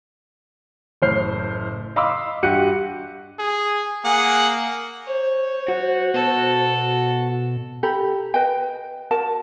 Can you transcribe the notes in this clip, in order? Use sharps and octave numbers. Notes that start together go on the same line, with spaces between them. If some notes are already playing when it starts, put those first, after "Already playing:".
F#1 A2 C5 F6 C7
D#5 F5 B5 C6 D6 E6
G2 F#4 G4 F#6 C#7 D#7
G#4
A#3 G#4 F#5
C5 C#5
F#3 F#4
B2 A4
G4 A4 A#5 B5
B4 D#5 G5
F#4 A#4 A5